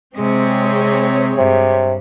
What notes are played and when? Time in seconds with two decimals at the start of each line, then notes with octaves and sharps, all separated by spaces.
0.16 C3 G#3 C4 G#4 C#5
1.37 G2 C3